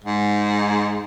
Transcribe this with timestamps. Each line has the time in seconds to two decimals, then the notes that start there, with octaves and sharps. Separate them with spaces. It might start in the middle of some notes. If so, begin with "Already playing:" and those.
0.04 G#2